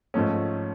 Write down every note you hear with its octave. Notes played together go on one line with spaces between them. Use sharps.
G#2 F3 A3 C#4